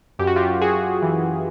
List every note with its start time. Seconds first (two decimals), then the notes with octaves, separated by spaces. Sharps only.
0.19 F#2 G4
0.27 F#4
0.36 F4 G4
0.61 F#2 F#4 G#4
1.02 E3